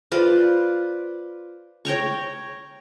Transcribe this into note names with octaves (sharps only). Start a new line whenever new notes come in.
F4 B4 C5 D5
C#5 G5 A#5 C#6